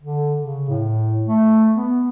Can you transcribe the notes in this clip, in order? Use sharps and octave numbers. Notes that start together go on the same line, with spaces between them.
D3
C#3
A2
A3
B3